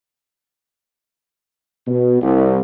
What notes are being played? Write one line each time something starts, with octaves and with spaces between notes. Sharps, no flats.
B2
C2